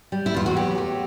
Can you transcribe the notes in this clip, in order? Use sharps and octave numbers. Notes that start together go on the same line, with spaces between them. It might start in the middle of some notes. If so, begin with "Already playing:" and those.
G3
E4
E2 F4
F#4
F#3 G4
A3